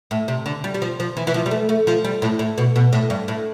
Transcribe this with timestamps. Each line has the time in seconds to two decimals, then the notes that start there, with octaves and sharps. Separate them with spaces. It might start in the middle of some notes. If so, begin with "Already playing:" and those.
0.11 A2
0.28 C3
0.46 D3
0.64 G3
0.74 G3
0.82 F3
1.00 F3
1.17 E3
1.27 E3
1.34 F3
1.46 G3
1.51 A3
1.69 A3
1.87 F3
2.04 G3
2.22 A2
2.39 A2
2.58 B2
2.76 B2
2.93 A2
3.10 G2
3.28 A2